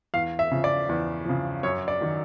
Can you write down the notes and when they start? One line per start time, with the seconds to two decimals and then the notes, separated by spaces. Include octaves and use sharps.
0.14 E2 F5
0.39 E5
0.51 C#3 F3
0.64 D5
0.89 E2
1.25 C#3 F3
1.63 F#2 C#5
1.88 D5
2.01 D#3 F#3